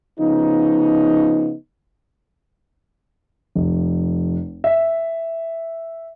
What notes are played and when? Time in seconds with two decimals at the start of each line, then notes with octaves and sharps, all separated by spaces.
0.19 C#3 F3 B3 D#4
3.55 F1
4.64 E5